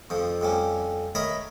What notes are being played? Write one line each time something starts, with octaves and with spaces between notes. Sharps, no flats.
F2 F3
F2 G3 C#4
A#4 C#5 D#5 E5 A#5 B5